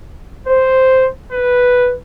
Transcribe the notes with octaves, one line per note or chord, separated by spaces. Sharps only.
C5
B4